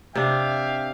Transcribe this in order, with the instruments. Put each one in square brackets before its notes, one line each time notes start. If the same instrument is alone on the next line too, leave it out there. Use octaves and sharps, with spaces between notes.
[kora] C3 D4 [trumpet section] E5 F5 G5